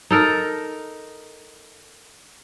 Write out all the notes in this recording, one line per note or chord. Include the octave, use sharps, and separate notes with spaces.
D#4 A4 A#4